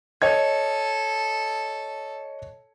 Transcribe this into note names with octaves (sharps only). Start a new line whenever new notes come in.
A4 C#5 D#5 G#6